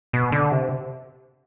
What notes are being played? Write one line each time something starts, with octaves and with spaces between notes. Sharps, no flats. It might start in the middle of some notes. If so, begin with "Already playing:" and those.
B2
D3
C3